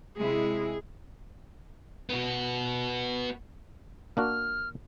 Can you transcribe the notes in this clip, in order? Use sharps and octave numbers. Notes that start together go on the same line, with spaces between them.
C3 G#3 E4 G#4
B3 F#4
A#3 D4 F#4 F6